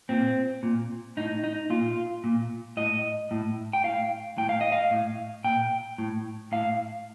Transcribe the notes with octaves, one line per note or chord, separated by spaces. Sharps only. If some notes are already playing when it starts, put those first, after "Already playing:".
A#2 C4
A#2
A2 D#4
D#4
A#2 F4
A#2
A2 D#5
A2
G5
A2 F5
A2 G5
F5
D#5
F5
A2
A#2 G5
A2
A2 F5